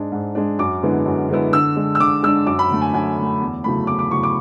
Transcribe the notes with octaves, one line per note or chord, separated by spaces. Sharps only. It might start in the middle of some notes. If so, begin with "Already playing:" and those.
Already playing: G#2 G#3 D4
G#2
G#3 D4
F#2 D6
D3 G#3 B3 E4
F#2
D3 G#3 B3 E4
D3 E6
G#3 D4
E6
D3 D6
G#3 D4 E6
F#2 D6
B5
D3 A3
G#5
F#2 G#5
D3 A3
E2
C#3 F#3 A3 E4 B5
E2 D6
D6
C#3 F#3 A3 E4 C#6
D6